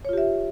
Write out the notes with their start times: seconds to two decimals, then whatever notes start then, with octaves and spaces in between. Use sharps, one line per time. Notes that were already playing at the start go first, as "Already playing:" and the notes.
0.05 C#5
0.09 F4
0.13 G4
0.18 E5